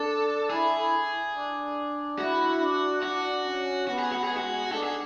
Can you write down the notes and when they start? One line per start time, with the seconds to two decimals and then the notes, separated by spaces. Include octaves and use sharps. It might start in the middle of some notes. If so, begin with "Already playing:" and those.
Already playing: D4 A4
0.50 E4 G#4
1.34 D4
2.18 E4 F#4
2.61 D4
3.03 D4 F#4
3.45 C#4
3.87 B3 F#4
3.99 G#4
4.12 F#4
4.24 G#4
4.30 G#3
4.37 F#4
4.72 D4 A4
4.83 G#4